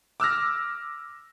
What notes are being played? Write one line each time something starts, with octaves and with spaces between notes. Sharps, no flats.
D6 E6 F6 A#6